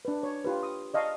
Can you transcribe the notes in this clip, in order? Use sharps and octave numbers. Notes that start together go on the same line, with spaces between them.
D4 B4
C#5
F4 G4 B4
D#6
D5 D#5 F5 A5 C#6